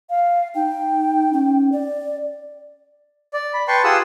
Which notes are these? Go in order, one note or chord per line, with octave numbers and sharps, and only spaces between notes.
F5
D#4 G5
C#4
D5
D5
B5
B4 G5 A5 C6 C#6
F4 G4 G#4 F#5 D#6 E6